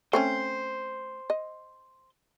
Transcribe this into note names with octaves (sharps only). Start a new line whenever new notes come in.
A3 C4 C#4 C5
D#5